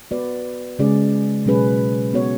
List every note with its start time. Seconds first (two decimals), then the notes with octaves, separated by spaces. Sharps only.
0.11 B3 F#4 B4 D5
0.79 C#3 G#3 C#4 G#4 D5
1.46 B2 F#3 C#4 G#4 B4
2.14 B3 F#4 C#5